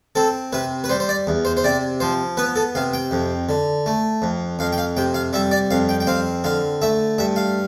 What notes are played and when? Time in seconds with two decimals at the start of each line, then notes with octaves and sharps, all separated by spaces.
0.15 C4 A4
0.53 C3 B4
0.84 B4
0.89 G3 C5
1.00 C5
1.09 D5
1.27 E2
1.45 C5
1.57 C5
1.64 C3 D5
2.00 F3 C5
2.37 B3 B4
2.56 A4
2.75 C3 F5
2.93 G5
3.11 F2
3.49 D3
3.86 A3
4.22 F2
4.59 F2 F5
4.73 G5
4.78 F5
4.97 C3 G5
5.14 F5
5.33 G3 E5
5.51 D5
5.71 F2 F5
5.89 G5
6.00 G5
6.07 C4 F5
6.44 D3 F5
6.82 A3 E5
7.18 G2 E5
7.36 F5